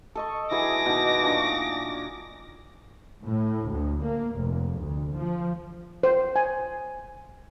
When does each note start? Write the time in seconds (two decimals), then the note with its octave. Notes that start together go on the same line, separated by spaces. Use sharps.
0.15 A4 D#5 C#6
0.51 E3 F#3 G#4 D6 A#6
0.86 B2 D#3
1.22 A#2 D4 C#6
3.24 A2
3.70 D2
4.04 A#3
4.36 F1
4.78 D2
5.15 F3
6.03 C5
6.36 G#5